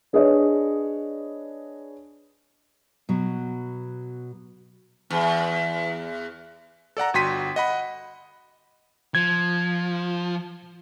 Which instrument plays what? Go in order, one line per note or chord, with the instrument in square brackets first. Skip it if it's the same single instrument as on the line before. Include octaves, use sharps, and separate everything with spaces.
[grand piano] D4 G#4 B4 C#5 D#5
[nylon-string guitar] B2 F#3
[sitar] E2
[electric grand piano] A4 D5 F#5 A#5
G1 F#4 G5 C6 B6 D#7
D#5 F#5 B5
[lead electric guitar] F3 [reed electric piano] G#6